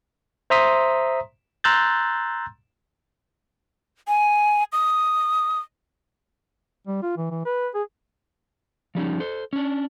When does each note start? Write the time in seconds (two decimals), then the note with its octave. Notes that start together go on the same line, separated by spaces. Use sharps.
0.50 C5 E5 A#5 C6 D#6 B6
1.64 A#5 C6 E6 F#6 G6 A6
4.08 G#5
4.73 D#6
6.87 G3
7.03 F4
7.17 E3
7.31 E3
7.46 B4
7.75 G#4
8.95 F3 G3 C#4 D#4
9.20 A4 C5
9.53 C#4 D4